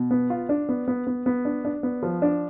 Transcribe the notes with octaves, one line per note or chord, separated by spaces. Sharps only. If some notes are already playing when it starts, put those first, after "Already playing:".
Already playing: B2
B3
F4
D4
B3
B3
B3
B3
D4
D4
B3
F3
D4